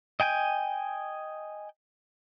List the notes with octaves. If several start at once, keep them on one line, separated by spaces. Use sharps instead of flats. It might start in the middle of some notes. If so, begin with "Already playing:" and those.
D#5 G5 G#5 G6